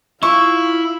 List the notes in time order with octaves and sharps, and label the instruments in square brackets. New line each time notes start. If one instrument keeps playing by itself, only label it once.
[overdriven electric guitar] E4 [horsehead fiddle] F4 [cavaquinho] C#6